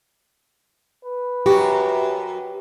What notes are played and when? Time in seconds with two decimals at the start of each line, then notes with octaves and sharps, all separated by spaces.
1.04 B4
1.46 F#2 F#4 G4